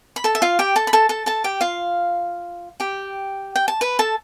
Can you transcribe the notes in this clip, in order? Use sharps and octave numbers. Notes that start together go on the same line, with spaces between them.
B5
A4 A5
E5
F4 F5
G4 G5
A4 A5
B5
A4 A5
A4 A5
A4 A5
G4 G5
F4 F5
G4 G5
G5
A5
B4 B5
A4 A5